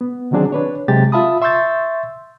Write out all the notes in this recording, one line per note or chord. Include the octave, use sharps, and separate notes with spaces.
B3
D3 D#3 F#3 C4 D4 G#4
D4 B4 C#5
C3 F#3 G#3 G4 A6
F4 E5 F5 A5 B5 D#6
E5 C6 C#6 E6 G6 A6